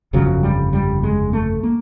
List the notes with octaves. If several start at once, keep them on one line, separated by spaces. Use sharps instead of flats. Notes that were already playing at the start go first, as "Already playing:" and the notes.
G1 F2 C#3 F#3
G3
G3
G#3
A3
A#3